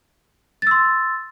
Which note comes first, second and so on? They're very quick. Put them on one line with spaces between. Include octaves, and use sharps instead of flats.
A6 E6 C6